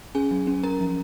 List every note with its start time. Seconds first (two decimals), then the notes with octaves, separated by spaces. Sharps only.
0.15 C#4 G#4 G#5
0.31 F#3
0.47 C#4
0.63 C#4 A#4 A#5
0.80 F3